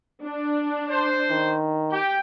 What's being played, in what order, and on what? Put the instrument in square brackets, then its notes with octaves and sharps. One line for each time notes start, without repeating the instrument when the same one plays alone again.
[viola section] D4
[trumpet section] C5
[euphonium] D#3
[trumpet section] G4 [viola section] G5